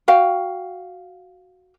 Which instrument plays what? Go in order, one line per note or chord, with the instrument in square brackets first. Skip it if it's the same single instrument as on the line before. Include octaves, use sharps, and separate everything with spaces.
[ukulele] F#4 F5 G5